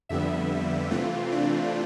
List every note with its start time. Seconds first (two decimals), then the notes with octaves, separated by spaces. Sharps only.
0.09 F2 D3 G3 B3 E5
0.91 C3 E3 A3 C4 F4
1.32 D4